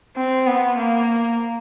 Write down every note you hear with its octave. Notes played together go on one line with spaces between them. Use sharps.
C4
B3
A#3